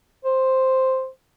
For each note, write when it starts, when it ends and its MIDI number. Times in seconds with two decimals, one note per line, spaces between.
0.25 1.08 72